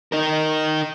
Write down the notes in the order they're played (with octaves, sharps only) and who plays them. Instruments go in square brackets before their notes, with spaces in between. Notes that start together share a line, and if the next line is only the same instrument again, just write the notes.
[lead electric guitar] D#4 A#4